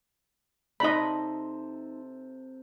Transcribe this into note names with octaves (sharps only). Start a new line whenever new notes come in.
C3 D#4 A4 D5 D#5 B5 C6